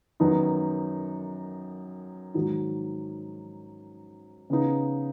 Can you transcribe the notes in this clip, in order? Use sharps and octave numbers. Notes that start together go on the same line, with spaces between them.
F#2 D#3 B3 D#4
G#2 D#3 F#3 D#4
C#3 B3 D#4